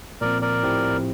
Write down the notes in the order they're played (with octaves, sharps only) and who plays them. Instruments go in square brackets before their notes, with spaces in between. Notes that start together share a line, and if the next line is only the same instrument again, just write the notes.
[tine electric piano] A#2 F3 C4 [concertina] A#4 D5
[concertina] A#4 D5
[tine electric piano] A2 F3 C4 E4 G4